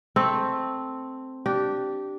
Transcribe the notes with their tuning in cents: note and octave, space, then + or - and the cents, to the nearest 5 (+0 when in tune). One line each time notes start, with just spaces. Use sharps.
A3 +0 C4 +0
D4 +0 G4 -15